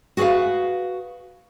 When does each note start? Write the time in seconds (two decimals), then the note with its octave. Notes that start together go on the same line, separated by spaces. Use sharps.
0.17 F#4 G#4 A#4 B4 F5